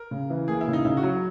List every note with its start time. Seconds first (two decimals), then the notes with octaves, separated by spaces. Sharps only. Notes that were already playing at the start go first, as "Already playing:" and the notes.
Already playing: A#4
0.11 C#3
0.30 E3
0.48 A#3 G#4
0.61 E4
0.67 C#3
0.73 D#4
0.85 C#3 E4
0.97 F#4
1.03 F#3